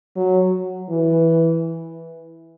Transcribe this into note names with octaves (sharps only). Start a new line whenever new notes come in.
F#3
E3